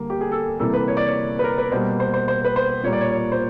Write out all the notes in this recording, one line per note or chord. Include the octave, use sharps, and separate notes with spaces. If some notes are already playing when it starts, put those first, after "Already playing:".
Already playing: D3 G3 A#3
G4
G#4
A4
C3 E3 G3 A#3 A4
B4
C#5
D5
C#5
B4
A#4
B4
B2 G3 A#3 C5
C5
C5
C5
B4
C5
A#2 G3 A#3 C#5
D5
C#5
C#5
C5